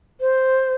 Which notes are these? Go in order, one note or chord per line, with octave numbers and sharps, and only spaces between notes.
C5